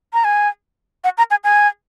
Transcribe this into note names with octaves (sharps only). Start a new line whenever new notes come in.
A#5
G#5
F#5
A#5
G#5
G#5